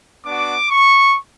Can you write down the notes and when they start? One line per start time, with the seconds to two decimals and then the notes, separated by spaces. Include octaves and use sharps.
0.25 B3 D4 F#4 D6
0.70 C#6